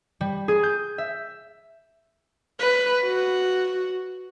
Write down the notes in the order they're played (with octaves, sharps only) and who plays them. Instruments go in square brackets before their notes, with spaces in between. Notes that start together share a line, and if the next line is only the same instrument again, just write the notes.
[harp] G3
G#4
G6
E5
[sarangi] B4
F#4